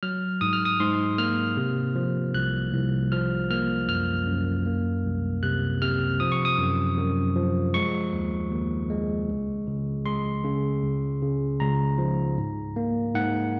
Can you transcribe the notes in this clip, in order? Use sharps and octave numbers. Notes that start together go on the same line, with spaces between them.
F#3 F6
G#2 D#6
F6
D#6
G#2 C6
A#3 F6
C3
F3
C2 F#6
C2
F3 F6
A#3 F6
F#2 F6
F#2
A#3
C2
C3 F#6
C3 F6
F3 D#6
C#6
D#6
F#2
F#2
F3
G#3 C#6
D#2
D#2
G#3
C#2
C#3
G#3 C6
C#3
C#2
C#3
C#2 A#5
F3
G#2
A#3
G#2 F#5